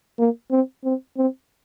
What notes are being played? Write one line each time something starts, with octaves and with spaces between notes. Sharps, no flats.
A#3
C4
C4
C4